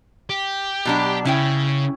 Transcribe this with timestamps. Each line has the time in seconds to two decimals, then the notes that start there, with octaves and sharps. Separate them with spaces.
0.30 G4
0.85 B2 F#3 D4
1.25 C#3 C#4 E4 G5